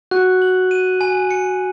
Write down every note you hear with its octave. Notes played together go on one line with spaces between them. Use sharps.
F#4 F#6
F#7
D#7
G#5
C#7